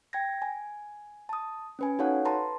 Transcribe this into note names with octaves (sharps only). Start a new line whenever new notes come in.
G5 G#6 A#6
G#5
A5 D#6
C#4 B4 G#5
D#4 F#4 A4 C#5 F5 F#5
B4 A5 A#5 C6